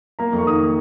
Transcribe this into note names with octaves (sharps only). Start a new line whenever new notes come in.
A#3 A#5
F2
C#6
D#3 D#6